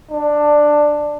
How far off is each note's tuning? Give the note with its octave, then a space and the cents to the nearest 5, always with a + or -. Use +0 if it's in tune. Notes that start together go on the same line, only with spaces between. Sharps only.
D4 +10